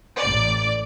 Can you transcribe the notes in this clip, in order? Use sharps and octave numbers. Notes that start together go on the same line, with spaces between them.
A1 D5